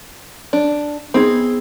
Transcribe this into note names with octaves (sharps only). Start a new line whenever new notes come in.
D4
B3 C4 D#4 G#4